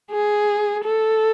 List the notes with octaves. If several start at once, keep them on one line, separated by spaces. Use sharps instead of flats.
G#4
A4